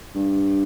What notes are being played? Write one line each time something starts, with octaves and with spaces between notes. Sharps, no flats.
G2